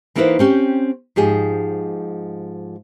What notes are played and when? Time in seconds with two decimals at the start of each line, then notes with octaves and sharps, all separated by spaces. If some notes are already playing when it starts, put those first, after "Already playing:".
0.15 E3 A#3 D#4 E4 B4 C5
0.39 C4 C#4 G4
1.16 G#2 F3 G4 G#4